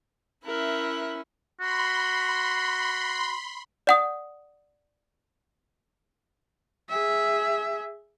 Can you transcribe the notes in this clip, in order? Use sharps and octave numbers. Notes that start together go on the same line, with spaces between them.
C#4 E4 A#4 E5 F#6
F#4 B5 C6
D5 F#5 D#6
G#4 E5